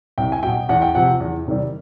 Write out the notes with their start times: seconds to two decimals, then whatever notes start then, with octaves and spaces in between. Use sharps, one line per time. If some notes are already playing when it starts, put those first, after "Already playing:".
0.18 C2 G5
0.32 G#5
0.43 B2 F#3 G5
0.69 E2 F#5
0.82 G5
0.94 C3 F3 F#5
1.20 E2
1.47 C3 D#3 G3